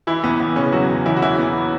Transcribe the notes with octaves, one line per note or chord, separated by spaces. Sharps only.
E3 E4
E2 B3
E2 B3
C#3 E3 C#4
E3 F#3 F#4
E2
E2 E3 E4
F#4
E3 E4
E3 B3